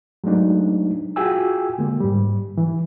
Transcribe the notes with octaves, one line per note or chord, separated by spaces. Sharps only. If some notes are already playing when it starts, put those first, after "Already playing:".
F#3 G#3 A3 D4 D#4
F4 F#4 G#4 G5 G#5 E6
D3 G#3 A#3
G#2 G3
E3